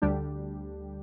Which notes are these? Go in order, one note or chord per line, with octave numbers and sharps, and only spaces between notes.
D2 D3 G3 D4 G4